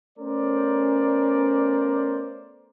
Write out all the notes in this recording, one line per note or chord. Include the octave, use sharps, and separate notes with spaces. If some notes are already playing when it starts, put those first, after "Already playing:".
A3 B3 C#4 A#4 C5 D5